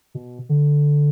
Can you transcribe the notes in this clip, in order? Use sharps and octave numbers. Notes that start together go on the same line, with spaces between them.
B2
D3